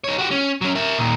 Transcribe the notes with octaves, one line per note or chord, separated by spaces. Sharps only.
D#4 C#5
F#4 G4
C#4
F#3 C#4
A#4 E5
A#2 D#3